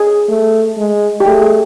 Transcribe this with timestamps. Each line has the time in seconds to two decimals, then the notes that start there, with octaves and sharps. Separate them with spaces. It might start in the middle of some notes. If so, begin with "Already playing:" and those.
Already playing: G#4
0.29 A3
0.77 G#3
1.20 G4
1.26 A3 G#4
1.41 G#4